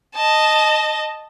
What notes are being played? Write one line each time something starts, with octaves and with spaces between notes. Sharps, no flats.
D#5 A5